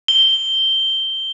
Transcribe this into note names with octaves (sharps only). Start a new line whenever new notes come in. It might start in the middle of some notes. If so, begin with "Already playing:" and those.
G7